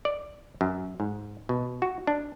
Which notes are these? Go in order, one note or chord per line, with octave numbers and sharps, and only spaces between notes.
D5
F#2
G#2
B2
F#4
D4